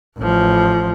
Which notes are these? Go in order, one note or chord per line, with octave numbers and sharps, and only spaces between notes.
A1 F3